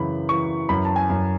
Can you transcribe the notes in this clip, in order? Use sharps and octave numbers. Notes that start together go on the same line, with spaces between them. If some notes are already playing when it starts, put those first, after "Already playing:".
Already playing: F#2 C#3 E3 B5
E3 C#6
F#2 B5
A5
G#5
F#2